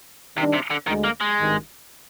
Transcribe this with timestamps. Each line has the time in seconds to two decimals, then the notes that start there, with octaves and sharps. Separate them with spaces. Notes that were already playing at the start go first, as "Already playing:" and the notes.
0.37 C3 D#3 G3 D4
0.53 C3
0.70 D3
0.87 D2 D3 D#3 G#3
1.04 A#3
1.21 G#3
1.38 G#1 G2 D#3